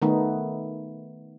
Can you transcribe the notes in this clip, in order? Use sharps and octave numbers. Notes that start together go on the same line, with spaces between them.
D#3 A3 B3 D#4